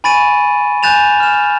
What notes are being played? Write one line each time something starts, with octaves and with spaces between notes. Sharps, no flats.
G#5 B5 C#6 A6 D7 D#7
G#5 F#6 G6 A6 E7 F7
F6 E7